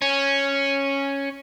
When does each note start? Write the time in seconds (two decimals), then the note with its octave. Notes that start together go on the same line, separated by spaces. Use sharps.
0.02 C#4